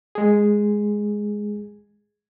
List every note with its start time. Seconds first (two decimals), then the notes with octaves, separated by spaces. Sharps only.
0.15 G#3 G#4